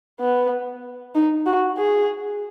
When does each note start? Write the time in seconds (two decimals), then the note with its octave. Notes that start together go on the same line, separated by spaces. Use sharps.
0.20 B3
1.15 D#4
1.46 F#4
1.77 G#4